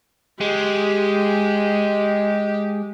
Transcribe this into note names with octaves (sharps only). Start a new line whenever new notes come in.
G#3 G4